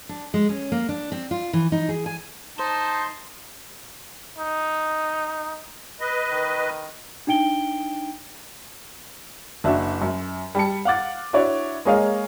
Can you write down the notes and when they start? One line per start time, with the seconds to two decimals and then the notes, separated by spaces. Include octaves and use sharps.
0.09 D4
0.34 G#3
0.49 C#4
0.72 A#3
0.89 D4
1.12 C4
1.31 F4
1.53 E3
1.72 D#4
1.89 G#4
2.06 G#5
2.59 D#4 C5 A5
4.38 D#4
6.00 B4 D#5
6.31 D#3
7.27 D4 D#4 G5 D7 G7
9.64 F#1 D4 F#4 E5
10.02 F#2
10.55 G3 A5 C#7
10.85 F5 F#5 D6 A6
11.33 D4 E4 F#4 C#5 D5
11.85 G#3 A#3 G#4 C#5 D#5 F5